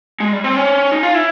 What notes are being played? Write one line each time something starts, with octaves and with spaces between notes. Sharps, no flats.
G#3
G3
C4
C#4
D#4
F4
E4